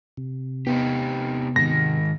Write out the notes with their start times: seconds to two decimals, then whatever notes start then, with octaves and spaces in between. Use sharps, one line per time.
0.17 C3
0.67 B3 C4 D#4 G4
1.56 G#2 D#3 A#6